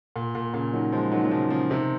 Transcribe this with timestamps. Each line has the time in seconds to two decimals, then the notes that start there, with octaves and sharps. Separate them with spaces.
0.16 A#2
0.35 A#2
0.54 A#2 C#3
0.73 D#3 F#3
0.92 F3 G#3
1.12 D#3 F#3
1.25 F#3
1.31 C#3 F3
1.50 C#3 F3
1.70 C3 D#3